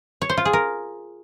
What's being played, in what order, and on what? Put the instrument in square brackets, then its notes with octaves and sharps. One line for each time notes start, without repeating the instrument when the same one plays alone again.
[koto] C#5
C5
F4
G#4
A#4